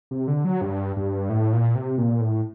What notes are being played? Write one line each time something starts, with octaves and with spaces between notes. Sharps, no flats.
C3
D3
F#3
G2
G2
A2
A#2
C3
A#2
A2